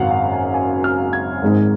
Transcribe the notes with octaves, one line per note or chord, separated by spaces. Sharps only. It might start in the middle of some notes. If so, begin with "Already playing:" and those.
Already playing: G#1 F#2 C#3 F#3 F5 F#5
F#5
G#5
G#5
F6
G#6
G#1 G#2 G#3